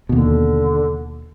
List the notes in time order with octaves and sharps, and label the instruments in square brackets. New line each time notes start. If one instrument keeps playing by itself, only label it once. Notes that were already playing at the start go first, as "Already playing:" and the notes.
[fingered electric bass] D#2 B2 [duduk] D3